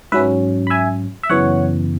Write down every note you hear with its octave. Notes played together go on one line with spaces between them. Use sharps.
G#2 F#3 C#4 B4 E5
B5
E5 G#5
E5
F#2 C#3 E3 B3 C#5 F#5